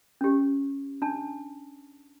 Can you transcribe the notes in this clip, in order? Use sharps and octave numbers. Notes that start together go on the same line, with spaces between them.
C#4 G4
D4 A5